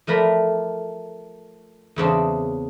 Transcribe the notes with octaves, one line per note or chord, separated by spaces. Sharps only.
F3 A3 A#4 D5 B5
E2 C#3 C4 D4